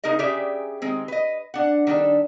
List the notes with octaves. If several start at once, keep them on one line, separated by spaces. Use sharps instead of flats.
C#3 D#4 G#4 A#4 D#5
C#3 G4 G#4 D5 E5 G5
D#3 G#3 C4
B4 D#5
D4 F#5
D#3 G3 D4 A4